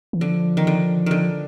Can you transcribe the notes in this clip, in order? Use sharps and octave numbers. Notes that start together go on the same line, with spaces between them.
E3
D3 F3
D#3
D3
D3 D#3